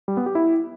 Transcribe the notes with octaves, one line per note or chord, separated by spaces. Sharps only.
G3
B3
G4
E4